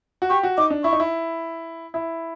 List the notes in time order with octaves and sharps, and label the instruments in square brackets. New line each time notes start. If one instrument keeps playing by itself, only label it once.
[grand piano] F#4
[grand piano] G4 [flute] C#6
[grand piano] F#4
[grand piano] D#4 [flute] D6
[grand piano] D4
[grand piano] E4 [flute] C#6
[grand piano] D#4
E4
E4